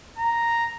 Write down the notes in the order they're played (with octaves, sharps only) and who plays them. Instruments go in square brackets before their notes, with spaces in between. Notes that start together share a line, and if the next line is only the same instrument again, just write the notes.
[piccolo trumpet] A#5